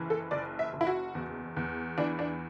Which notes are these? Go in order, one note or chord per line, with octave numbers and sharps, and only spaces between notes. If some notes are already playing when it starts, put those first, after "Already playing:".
Already playing: F#1 E3
A4
F#1 D5
E5
F#1
E4
F#4
E2
E2
E3 D4
D4